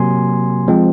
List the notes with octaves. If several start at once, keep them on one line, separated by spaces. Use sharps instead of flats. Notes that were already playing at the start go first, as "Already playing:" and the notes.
Already playing: C3 F#3 A#3 G#5 C6
F3 G#3 C4